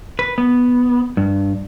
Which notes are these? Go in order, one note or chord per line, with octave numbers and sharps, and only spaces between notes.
B4
B3
G2